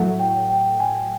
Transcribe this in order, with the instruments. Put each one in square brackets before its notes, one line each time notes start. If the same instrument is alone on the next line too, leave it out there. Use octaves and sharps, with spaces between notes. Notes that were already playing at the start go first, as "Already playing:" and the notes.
Already playing: [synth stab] A2 F#3 A3 [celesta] F#5
[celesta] G5
G5
G#5